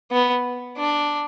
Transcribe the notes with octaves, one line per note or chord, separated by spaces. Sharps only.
B3
D4